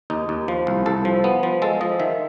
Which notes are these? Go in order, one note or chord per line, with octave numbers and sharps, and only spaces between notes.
D#2 D#4
D#2
F3
C2
C2 A4
F3
B3
F3
G#3 A4
F3 D#5
D#3 E5